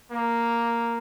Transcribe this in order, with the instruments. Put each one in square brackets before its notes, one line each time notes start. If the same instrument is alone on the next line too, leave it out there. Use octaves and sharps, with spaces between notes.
[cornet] A#3